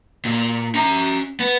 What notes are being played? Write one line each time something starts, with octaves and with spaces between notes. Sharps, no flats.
A#2
C#4 A#5
B3